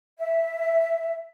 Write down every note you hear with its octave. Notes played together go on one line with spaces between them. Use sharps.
E5